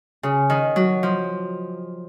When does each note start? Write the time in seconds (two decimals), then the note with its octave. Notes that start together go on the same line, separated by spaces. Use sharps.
0.23 C#3
0.50 D#3
0.76 F#3
1.03 F3